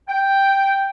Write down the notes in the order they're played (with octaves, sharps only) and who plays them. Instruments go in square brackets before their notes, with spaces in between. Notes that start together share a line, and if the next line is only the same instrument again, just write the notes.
[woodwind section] G5